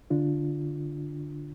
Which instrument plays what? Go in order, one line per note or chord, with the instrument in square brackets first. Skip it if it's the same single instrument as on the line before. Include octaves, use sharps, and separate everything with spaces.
[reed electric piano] D3 D4 F4